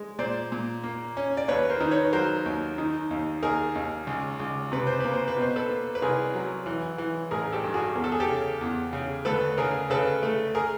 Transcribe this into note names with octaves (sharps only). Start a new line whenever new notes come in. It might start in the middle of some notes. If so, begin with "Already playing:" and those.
Already playing: G#3
A#2 C5 D5
A#2
A#3
C#4
D5
D#2 B4 C#5
A#4 C5
D#3
B4 C#5
F#3 A#4 C5
D#2
D#3
D#2
D#2 G#4 A#4
D#2
C#2
C#2
C3 B4
C5
A#3 B4
C5
B4
B2
C5
A4 B4
A#3
B4
C2 G#4 A#4
F#3
E3
E3
A1 G#4 A#4
G4 A4
G2
F#4 G#4
E2 A#4
A4
G#4
G4 A4
C#3
E2
C#3
D2 A4 B4
C#3 G#4 A#4
C#3 A4 B4
A3
G#4 A#4